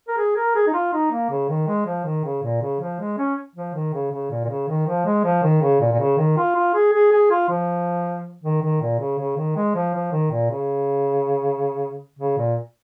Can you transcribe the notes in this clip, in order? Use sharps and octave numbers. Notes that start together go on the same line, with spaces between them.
A#4
G#4
A#4
G#4
D#4
F4
D#4
A#3
C#3
D#3
G#3
F3
D#3
C#3
A#2
C#3
F3
G#3
C#4
F3
D#3
C#3
C#3
A#2
A#2
C#3
D#3
F3
G#3
F3
D#3
C#3
A#2
A#2
C#3
D#3
F4
F4
G#4
G#4
G#4
F4
F3
D#3
D#3
A#2
C#3
C#3
D#3
G#3
F3
F3
D#3
A#2
C#3
C#3
A#2